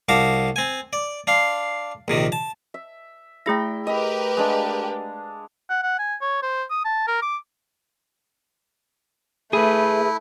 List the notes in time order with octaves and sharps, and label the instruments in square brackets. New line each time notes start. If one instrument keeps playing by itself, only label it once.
[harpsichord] C2 F#4 F5 A5 D6
C4 G#5
D5
D4 F5 C6
A#1 C3 D#3
A5
[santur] E5
[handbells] A3 G#4 A#6 [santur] E4 G5
[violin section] G4 A#4 B4 [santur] D#5 G5 B5
[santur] G#3 D4 F5
[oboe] F#5
F#5
G#5
C#5
C5
D#6
A5
A#4
D6
[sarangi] A3 [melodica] E4 [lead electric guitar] G#4 B4